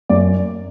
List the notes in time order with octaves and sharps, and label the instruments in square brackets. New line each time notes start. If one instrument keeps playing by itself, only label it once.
[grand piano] F#2 D5